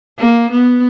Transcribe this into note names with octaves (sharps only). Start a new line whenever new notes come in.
A#3
B3